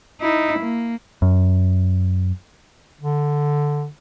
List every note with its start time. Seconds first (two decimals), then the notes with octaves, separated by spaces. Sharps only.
0.21 D#4 E4
0.58 A#3
1.22 F#2
3.01 D3